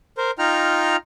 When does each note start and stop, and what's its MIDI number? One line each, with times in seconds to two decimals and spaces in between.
0.18 0.31 70
0.18 0.31 72
0.39 0.96 63
0.39 0.96 65
0.39 0.96 79
0.39 0.96 82
0.39 0.96 89